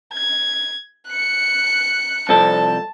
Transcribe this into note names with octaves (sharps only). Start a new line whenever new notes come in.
G#6
F#6 C#7
C2 F3 A4 A5